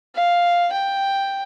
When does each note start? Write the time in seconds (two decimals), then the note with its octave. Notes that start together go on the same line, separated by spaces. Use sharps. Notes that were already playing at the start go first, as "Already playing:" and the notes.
0.15 F5
0.73 G5